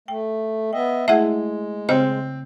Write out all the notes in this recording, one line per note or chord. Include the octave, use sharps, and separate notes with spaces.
A3 G5
B3 D#5 E5 G5
G#3 A3 E4 G#4 E5 F#5
C#3 C4 D#5